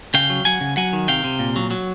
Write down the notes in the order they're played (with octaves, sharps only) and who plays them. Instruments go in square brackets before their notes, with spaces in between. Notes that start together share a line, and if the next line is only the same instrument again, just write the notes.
[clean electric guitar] C#3 F5 G5
F#3
F#3 F#5 G#5
C#3
F#3 F#5 G#5
D#3
C3 F5 G5
C3
A#2
F#3
F#3